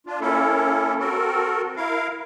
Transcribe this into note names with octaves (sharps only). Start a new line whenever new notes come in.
D4 F4
A#3 C#4 E4 A4
C4 F#4 A4 A#4
E4 A#4 F5